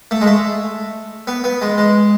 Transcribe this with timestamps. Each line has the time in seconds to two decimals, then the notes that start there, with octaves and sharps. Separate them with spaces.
0.11 A3
0.21 G#3
0.27 A3
1.27 B3
1.44 B3
1.62 G#3
1.78 G#3